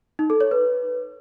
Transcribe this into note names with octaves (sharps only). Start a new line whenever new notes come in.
D#4
A4
C#5
B4